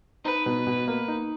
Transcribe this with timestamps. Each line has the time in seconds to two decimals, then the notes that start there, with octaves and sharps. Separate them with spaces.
0.24 D#4 B4
0.46 B2
0.67 B2
0.88 A#3
1.08 D#4